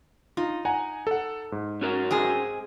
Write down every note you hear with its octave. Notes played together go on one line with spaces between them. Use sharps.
D#4 F4
F#5 G#5 A#5
A4 F#5
G#2
C#4 F#4 A#4
G#3 C4 G#4